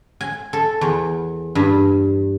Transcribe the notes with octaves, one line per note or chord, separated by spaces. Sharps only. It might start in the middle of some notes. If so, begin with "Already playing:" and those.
G#5
A4
E2
G2